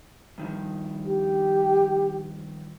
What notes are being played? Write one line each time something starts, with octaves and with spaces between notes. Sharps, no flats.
G2 D#3 F3
G4